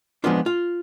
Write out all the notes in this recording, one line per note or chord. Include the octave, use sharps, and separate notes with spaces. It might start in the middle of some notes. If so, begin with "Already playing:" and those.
F3 G#3 B3 D4 F4
F4